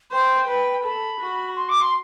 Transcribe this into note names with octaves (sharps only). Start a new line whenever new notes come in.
C5 G5
B4
A4 B5
F#4
C6
D6
C6